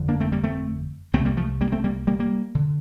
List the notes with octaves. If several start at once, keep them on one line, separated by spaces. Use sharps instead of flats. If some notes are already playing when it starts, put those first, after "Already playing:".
Already playing: G1 F2 D3
A#3 D4
A3 C4
G3 A#3
A3 C4
C2 C3 A3 C4
G3 A#3
F3 A3
G3 A#3
A3 C4
G3 A#3
G3 A#3
G3 A#3
D3